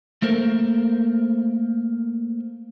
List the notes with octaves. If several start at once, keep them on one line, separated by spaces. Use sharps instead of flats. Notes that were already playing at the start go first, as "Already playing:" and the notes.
A3 A#3 A4 A#4 C5